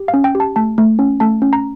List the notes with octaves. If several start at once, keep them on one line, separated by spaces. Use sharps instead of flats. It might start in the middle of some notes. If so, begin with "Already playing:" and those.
Already playing: G4
F5
C#4
G5
G4
A5
A3 A5
A3
C#4
A3 A5
C#4
A#5